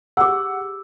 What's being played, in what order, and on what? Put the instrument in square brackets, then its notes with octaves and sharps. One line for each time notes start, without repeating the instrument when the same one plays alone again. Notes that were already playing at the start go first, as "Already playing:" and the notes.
[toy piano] G4 G#4 [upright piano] F#5 [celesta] D6 E6